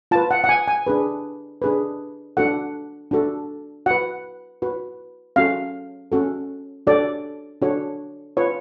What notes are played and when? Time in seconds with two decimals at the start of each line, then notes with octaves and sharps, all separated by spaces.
0.11 F4 B4 A5
0.31 F#5
0.44 F#5
0.49 G#5
0.68 G#5
0.87 D4 G#4 B4
1.62 D4 G#4 B4
2.37 D4 F#4 A4 F#5
3.11 D4 F#4 A4
3.86 F#4 B4 F#5
4.62 F#4 B4
5.36 C#4 F#4 A4 F5
6.12 C#4 F#4 A4
6.87 D4 F#4 A4 C#5 D5
7.62 D4 F#4 A4 C#5
8.37 F4 B4 C#5